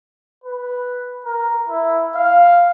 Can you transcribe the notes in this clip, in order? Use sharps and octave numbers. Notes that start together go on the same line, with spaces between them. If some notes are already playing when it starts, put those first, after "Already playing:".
B4
A#4
E4
F5